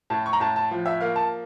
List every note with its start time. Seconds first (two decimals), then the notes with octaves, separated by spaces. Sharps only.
0.10 A2 A5
0.26 C#6
0.33 A#5
0.40 A2 A5
0.56 A5
0.71 F3
0.86 E5
1.01 A#3 F5
1.16 A5